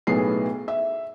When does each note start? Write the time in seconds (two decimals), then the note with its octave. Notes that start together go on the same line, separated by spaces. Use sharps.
0.07 B1 A2 B3 G#4 A4 C7
0.68 E5